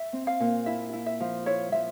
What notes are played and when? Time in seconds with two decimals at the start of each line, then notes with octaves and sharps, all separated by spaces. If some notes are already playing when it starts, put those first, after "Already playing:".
Already playing: E5
0.13 C4
0.27 F5
0.40 A#2
0.66 E4 E5
0.93 E4
1.06 E5
1.20 F3
1.46 E4 C#5
1.72 F3 E5